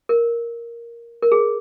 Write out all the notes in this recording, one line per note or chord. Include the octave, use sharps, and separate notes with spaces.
A#4
A#4
G#4